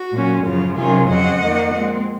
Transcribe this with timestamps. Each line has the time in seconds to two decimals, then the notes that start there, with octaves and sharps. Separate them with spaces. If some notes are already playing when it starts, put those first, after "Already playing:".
Already playing: F#4
0.13 A#2 F#3 C#4
0.45 F#2 C#3 F3 F4
0.77 C3 D#3 F#3 C#4 F4 G#4
1.10 F2 C#3 F#3 C4 D#5 F#5
1.41 F2 D#3 A#3
1.74 A#2 G#3 C4